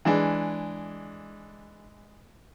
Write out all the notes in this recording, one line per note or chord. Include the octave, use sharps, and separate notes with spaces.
E3 G#3 D4